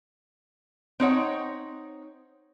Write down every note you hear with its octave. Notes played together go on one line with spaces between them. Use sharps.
C4 D#4 C#5 F#5